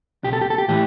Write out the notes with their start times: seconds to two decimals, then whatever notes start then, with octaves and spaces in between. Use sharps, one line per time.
0.24 B1 G4
0.33 A4
0.41 G4
0.50 A4
0.58 G4
0.68 A2 E3 G4